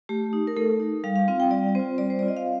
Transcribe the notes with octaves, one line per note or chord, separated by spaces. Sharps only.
A3 G4
D#4
A#4
A3 A4
D#4
G3 F5
F5
C4 F4 F5
G5
G3 D5
C4 F4 C5
G3 D5
C5
C4 F4 D5
D#5
F5